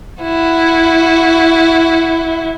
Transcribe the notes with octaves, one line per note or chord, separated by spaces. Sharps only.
E4 F#4